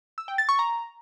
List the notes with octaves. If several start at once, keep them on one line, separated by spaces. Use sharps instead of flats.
E6
G5
A6
C#6
A#5